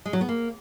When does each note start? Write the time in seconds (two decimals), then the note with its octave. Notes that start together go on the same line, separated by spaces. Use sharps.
0.06 G#3
0.13 F#3
0.21 B3
0.29 A#3